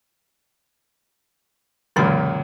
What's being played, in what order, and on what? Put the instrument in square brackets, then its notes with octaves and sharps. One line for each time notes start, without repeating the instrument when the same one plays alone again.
[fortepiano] C#2 F#2 A#2 [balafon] D3 E3 B5